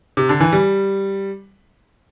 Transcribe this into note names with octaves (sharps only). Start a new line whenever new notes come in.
C3
D3
E3
G3